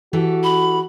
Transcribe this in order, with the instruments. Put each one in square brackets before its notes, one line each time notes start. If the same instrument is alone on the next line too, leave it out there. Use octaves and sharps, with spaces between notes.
[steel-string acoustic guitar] E3 G4 A4 [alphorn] F#4
[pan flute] B5